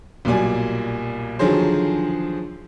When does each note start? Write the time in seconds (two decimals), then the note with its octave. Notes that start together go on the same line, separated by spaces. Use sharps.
0.25 B1 A#2 G3 D5 G#5
1.39 D3 D#3 F3 F#3 G#4 C5